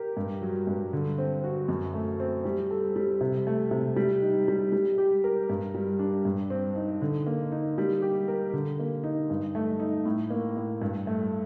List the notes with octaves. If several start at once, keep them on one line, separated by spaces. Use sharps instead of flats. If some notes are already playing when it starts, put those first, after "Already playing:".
Already playing: G4 A#4
G2
F#3
G2
D3
C4
F#4
F#2
A3
C4
G3
A4
G3
C3
A3
C3
G3
D#4
G3
G3
G4
A#4
G2
G3
D4
G2
C4
D#4
D3
A#3
D#4
G3
G4
A#4
D3
A#3
D#4
G2
A3
D#4
A2
A#3
A2
G2
A3